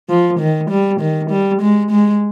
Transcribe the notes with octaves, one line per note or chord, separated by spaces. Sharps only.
F3
D#3
G3
D#3
G3
G#3
G#3